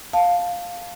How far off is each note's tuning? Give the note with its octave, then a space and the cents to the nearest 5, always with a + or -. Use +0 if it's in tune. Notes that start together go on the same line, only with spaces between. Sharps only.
F5 +10 A5 +0